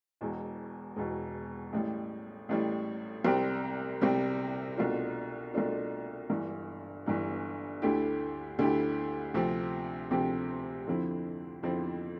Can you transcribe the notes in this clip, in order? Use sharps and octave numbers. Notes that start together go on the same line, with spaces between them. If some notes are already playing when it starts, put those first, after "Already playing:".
E1 E2 B2
E1 E2 B2
A1 A2 G3
A1 A2 G3
C2 C3 G3 C4 G4
C2 C3 G3 C4 G4
C2 B2 A3 D4 F4
C2 B2 A3 D4 F4
G1 G2 E3
G1 G2 E3
D2 D3 A3 E4 G4
D2 D3 A3 E4 G4
D2 C3 F3 C4 G4
D2 C3 F3 C4 G4
F2 D3 F3 C4 E4
F2 D3 F3 C4 E4